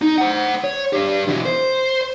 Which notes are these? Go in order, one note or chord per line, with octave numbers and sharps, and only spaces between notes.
D#4
C5 F#5
C#5
D4 G4
B2 E3
C5